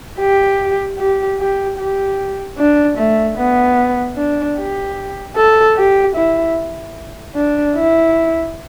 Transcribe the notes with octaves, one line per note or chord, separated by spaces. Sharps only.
G4
G4
G4
G4
D4
A3
B3
D4
G4
A4
G4
E4
D4
E4